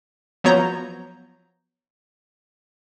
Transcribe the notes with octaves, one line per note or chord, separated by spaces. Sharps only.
F3 F#3 B3 C#5 A#5 G6